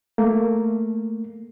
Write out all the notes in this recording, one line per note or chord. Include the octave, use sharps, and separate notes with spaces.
A3 A#3